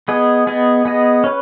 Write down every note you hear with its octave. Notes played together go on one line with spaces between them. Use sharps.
B3 G#4 D#5
B3 G#4 D#5
B3 G#4 D#5
C#4 B4